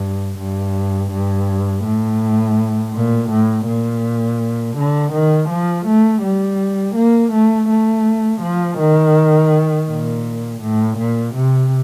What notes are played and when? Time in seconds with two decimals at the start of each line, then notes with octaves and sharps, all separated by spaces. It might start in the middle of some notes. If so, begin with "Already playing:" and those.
Already playing: G2
0.38 G2
1.11 G2
1.84 A2
2.94 A#2
3.30 A2
3.66 A#2
4.77 D3
5.13 D#3
5.49 F3
5.87 A3
6.22 G3
6.96 A#3
7.32 A3
7.69 A3
8.42 F3
8.79 D#3
9.88 A#2
10.62 A2
10.98 A#2
11.34 C3